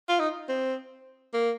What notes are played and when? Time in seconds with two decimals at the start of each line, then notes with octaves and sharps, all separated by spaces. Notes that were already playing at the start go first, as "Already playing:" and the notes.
0.09 F4
0.19 D#4
0.49 C4
1.34 A#3